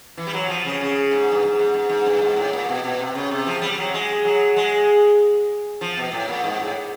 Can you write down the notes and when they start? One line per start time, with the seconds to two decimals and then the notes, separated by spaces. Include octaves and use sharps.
0.17 E3
0.27 G3
0.33 F#3
0.49 F3
0.65 C#3
0.81 C#3
1.11 G#2
1.32 G2
1.43 G#2
1.59 G#2
1.74 G#2
1.89 G#2
2.06 G2
2.22 G#2
2.36 A2
2.53 A#2
2.69 B2
2.84 B2
2.99 C3
3.15 C#3
3.31 C3
3.47 F3
3.62 G3
3.78 F#3
3.94 G#3
4.25 F#3
4.56 G#3
5.81 F3
5.97 B2
6.12 A2
6.28 A#2
6.44 G#2
6.60 A2